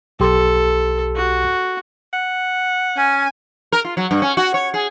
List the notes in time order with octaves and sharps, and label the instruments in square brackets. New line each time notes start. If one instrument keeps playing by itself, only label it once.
[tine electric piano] B1 G4 C6 [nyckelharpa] A4
[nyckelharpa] F#4
[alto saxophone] F#5
[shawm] C#4 [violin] G#5
[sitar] A#4
F4
F#3
G2
C#4
F#4
C#5
G#4